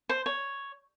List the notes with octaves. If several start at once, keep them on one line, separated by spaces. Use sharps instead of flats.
C5
C#5